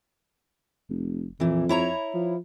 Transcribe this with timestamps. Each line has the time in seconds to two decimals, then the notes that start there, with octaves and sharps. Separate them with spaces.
0.89 F1
1.40 F2 A#2 E3
1.69 E4 C#5 A#5
2.14 F3